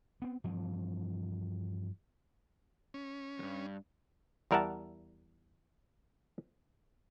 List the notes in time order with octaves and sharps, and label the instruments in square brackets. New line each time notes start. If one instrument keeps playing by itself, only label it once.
[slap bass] B3 C4
G2 E3 F3 C4
[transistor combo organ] C#4
[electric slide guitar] E2 G2
[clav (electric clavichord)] E2 G3 A#4 E5 F#5 A5